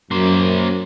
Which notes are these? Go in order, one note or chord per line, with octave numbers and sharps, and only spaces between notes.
F#2 A#3 C5